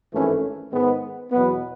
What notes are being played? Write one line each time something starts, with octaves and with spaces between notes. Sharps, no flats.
G#1 G2 E3 A3 C#4
G#2 D#3 G#3 B3
E2 B2 F#3 B3